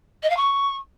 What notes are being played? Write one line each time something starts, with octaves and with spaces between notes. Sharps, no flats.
D#5
F5
C#6